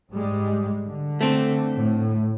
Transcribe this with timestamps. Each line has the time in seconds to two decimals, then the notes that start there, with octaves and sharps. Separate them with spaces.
0.11 G#2 G3 G#3
0.85 D3
1.21 A3 C4
1.75 A2